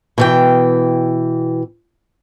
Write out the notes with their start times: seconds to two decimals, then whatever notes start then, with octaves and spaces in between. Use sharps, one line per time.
0.18 B2 E3 G5